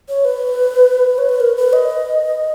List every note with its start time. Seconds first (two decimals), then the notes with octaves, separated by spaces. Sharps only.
0.09 C#5
0.25 B4
1.18 C#5
1.29 B4
1.40 A#4
1.57 B4
1.73 D#5